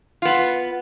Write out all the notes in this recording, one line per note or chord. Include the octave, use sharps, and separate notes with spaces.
B3 F4